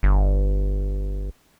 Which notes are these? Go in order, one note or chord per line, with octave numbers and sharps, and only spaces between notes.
G1